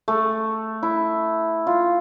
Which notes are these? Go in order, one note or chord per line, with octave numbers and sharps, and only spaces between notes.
A3
E4
F4